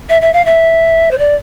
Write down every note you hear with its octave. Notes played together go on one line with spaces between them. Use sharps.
E5
E5
F5
E5
C5
D5